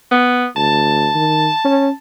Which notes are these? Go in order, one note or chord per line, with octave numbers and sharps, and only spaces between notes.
B3
D2 A5
D#3
C#4